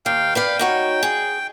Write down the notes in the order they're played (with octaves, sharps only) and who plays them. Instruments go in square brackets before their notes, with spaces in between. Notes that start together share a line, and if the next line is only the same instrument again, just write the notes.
[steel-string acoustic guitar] D#2 [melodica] F5 G5
[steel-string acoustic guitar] B4 D5 F5 [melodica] G5
[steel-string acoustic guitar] D#4 F#4 C#5
G#4